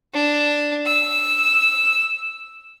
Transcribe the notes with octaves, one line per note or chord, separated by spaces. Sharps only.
D4
E6